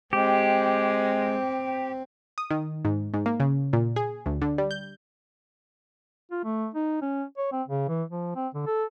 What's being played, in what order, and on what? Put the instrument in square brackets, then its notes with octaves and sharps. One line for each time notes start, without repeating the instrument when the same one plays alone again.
[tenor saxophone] G#3 [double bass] C4 [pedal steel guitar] G4
[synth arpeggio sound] D#6
D#3
G#2
G#2
A#3
C#3
A#2
G#4
D2
D3
G3
G6
[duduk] F4
A3
D#4
C#4
C#5
C4
C#3
E3
F3
C4
D3
A4